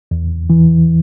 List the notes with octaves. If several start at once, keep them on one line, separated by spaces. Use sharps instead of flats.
E2
E3